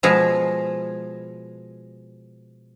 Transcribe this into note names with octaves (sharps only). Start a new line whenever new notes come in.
B2 F3 G#3